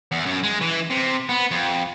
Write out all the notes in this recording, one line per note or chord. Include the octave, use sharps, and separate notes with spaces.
E2
F#2
G#3
E3
C3
B3
F2